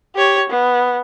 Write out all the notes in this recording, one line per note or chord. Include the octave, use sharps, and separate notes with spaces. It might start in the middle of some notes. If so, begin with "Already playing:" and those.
G4 C#5
B3